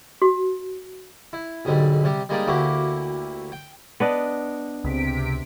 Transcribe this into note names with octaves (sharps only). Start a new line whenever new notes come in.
F#4
E4
B1 G#2 D3 G3
C3 G3 G4
G3 G#3 A#3 D#4 G4 D5
D2 A#3 E4 F#4 G4 D6
G5
B3 D4 D#5
C#2 C3 B6 D7